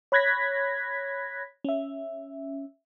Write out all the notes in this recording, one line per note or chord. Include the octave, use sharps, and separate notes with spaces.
C#5 B5 F#6 G#6 A#6 B6
C#4 E5